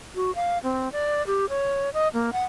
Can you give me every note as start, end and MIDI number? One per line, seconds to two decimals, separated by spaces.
0.16 0.34 66
0.35 0.58 77
0.64 0.91 60
0.92 1.25 74
1.27 1.46 67
1.49 1.90 73
1.94 2.08 75
2.14 2.30 58
2.33 2.43 78